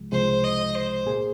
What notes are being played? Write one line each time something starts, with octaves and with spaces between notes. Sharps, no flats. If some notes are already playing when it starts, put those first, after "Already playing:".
Already playing: C2 C3 F3 G#3
C2 C3 F3 G#3 C5
D#5
C5
A#2 A#3 G#4